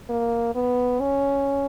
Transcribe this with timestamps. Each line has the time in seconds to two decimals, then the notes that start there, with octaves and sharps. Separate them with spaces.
0.09 A#3
0.55 B3
1.00 C#4